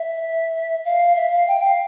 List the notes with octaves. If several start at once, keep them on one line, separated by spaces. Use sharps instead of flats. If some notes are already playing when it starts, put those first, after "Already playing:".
Already playing: E5
F5
E5
F5
G5
F5